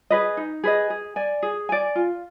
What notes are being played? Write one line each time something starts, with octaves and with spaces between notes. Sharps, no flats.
G#4 B4 D#5
D#4
G#4 B4 D#5
G#4
D5 G#5
G#4
D5 G#5
F4